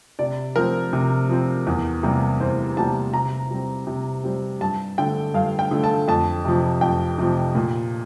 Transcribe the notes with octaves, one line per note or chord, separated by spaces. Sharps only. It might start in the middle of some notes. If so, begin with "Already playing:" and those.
C3 D5
F3 C4 A#4
C3
F3 C4
E2
C3 G3 A#3
E2 C5
C3 G3 A#3 A5
C3 A#5
G3 C4
C3
G3 C4
G2 A5
D3 A3 G5
G2 F5
G5
D3 A3
A5
F2 A5
C3 F3
F2 G5
C3 F3
A#2